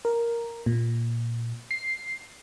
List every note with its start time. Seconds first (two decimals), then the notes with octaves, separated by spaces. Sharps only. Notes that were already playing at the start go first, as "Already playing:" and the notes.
0.05 A#4
0.66 A#2
1.71 C7